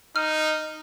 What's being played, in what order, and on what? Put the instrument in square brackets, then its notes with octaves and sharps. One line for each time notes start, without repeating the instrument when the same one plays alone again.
[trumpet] D#4 [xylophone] F6